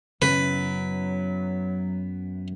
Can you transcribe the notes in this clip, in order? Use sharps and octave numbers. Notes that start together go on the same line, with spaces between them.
F#2 C#3 F#3 B3 C#4 E4 B4